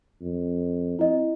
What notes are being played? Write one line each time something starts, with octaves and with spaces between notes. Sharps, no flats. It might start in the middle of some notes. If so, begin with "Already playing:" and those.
F2
C4 E4 D#5